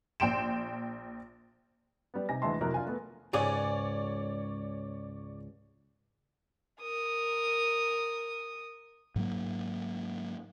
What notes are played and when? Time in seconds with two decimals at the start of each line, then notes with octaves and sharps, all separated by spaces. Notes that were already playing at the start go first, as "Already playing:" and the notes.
0.20 A#1 G5 C6 D7 E7
2.14 G3 B3
2.29 C3 D#4 G#5 A#6
2.42 D2 E3 G#3 E5 A5 C6
2.61 F2 C3 F#3 E4 A#4 F#6
2.74 D4 F4 G#5
2.87 A3 B3
3.33 C#2 G#2 G#4 C#5 D5
6.81 A#4 D#6
9.16 G#2 F#3 A#3